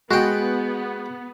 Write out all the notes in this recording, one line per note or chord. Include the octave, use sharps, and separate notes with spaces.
G#3 B3 F#4 G5